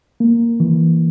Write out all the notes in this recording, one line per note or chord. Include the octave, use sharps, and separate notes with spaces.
A#3
E3